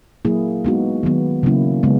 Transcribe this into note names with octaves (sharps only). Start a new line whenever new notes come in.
F#3 A#3 E4 G#4
G#3 B3 D#4 F#4
D#3 F#3 B3
C#3 F#3 A#3 C#4 E4
C#3 G#3 B3